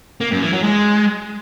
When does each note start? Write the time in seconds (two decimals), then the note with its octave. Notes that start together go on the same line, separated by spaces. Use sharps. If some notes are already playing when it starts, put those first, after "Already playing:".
0.21 A#3
0.31 F#2
0.42 E3
0.53 F#3
0.63 G#3